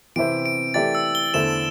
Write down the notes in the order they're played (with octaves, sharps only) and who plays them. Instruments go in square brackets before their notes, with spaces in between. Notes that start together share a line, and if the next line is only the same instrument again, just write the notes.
[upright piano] C3 E3 C4 E4 C5 [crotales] D7
[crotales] D7
[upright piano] E3 A3 E4 G4 D5 [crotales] A6
[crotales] E6
G7
[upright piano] E2 D3 A3 E4 C5 [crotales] E7